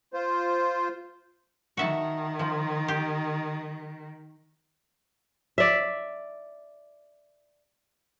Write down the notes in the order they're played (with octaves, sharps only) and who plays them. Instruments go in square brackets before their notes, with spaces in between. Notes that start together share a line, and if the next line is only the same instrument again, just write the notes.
[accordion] F4 C5
[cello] D#3 [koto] F#4 E5 A5
[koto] F3
G4
[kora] D5 E5